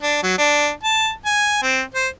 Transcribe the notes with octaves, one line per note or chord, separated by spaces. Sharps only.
D4
F#3
D4
A5
G#5
C4
C5